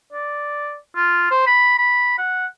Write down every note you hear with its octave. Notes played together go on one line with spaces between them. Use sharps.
D5
F4
C5
B5
B5
F#5